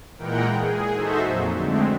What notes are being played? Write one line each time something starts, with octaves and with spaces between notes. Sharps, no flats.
A#2 E3 G#3 A#4 F#5 G5
G#4
D#4 F#4 A4 C5 E5
F2 A#2 F#3
D3 G#3 A3 C4